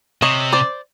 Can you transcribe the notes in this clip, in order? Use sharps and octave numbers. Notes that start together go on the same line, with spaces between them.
C3 C#5 D#5
C5 D5